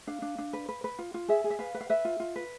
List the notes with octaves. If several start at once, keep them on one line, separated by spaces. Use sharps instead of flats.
D4 F5
D4
D4
B4
B4
B4
F4
F4
G#4 E5
G#4
E5
B4 F5
B4
F5
B4 E5
F4
F4
B4